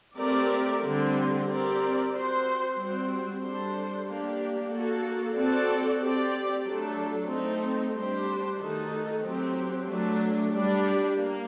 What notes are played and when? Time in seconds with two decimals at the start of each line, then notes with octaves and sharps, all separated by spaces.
0.18 A3 C4 G4 A#4 D5
0.83 D3 G3 C4
1.47 C4 G4 A#4 D5
2.12 C4 F#4 C5
2.76 G3 C4 F#4 C5
3.41 G3 D4 A4 C5
4.06 A#3 D4 G4
4.71 A#3 F#4 A4
5.35 C4 F#4 A4 D5
6.00 C4 G4 D5
6.65 F#3 A3 D4 A4
7.29 A3 C4 D#4 A4
7.93 G3 D4 G4 C5
8.58 D#3 A3 D#4 F#4 A4
9.23 F#3 C4 G4
9.88 F#3 A3 D4
10.52 G3 D4 G4
11.17 A#3